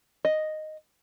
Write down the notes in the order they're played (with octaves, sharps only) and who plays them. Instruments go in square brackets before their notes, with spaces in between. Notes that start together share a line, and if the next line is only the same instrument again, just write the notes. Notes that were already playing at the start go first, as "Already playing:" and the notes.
[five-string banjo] D#5